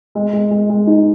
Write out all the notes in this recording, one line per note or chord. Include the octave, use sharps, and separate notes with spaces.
G#3
G#3
G#3
G#3
D#4